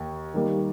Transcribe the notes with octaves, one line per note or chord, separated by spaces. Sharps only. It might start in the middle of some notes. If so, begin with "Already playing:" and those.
Already playing: D#2
D#3 G3 A#3